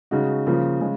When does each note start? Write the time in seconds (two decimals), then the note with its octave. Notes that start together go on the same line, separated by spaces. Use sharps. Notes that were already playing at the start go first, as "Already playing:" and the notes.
0.11 C#3 G#3 D#4 F#4
0.46 C#3 F3 A#3 F4
0.81 C#3 G#3